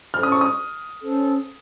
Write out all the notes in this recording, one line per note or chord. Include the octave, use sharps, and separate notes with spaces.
C#4 A4 C5 F6
D#6
C#6
D#6
C#4 A4 C5